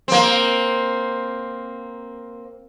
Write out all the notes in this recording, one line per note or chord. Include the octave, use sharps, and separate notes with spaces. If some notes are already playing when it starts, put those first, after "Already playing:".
A#3 C4